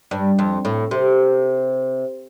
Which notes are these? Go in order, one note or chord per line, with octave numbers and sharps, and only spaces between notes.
G2
F2
A2
C3